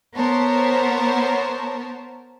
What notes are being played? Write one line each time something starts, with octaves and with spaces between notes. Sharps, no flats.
B3 A#4 C5 C#5 A5